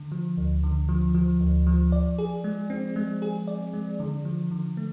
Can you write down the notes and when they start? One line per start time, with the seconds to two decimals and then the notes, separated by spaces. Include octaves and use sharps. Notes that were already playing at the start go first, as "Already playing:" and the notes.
Already playing: D3
0.12 F3
0.37 D2
0.63 D3
0.89 F3
1.14 F3
1.40 D2
1.67 F3
1.92 D5
2.18 G#4
2.44 G#3
2.70 C4
2.96 G#3
3.22 G#4
3.47 D5
3.73 G#3
4.00 D3
4.25 F3
4.51 D3
4.77 A3